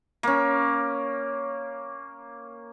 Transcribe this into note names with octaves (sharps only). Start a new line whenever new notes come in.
A#3 C#4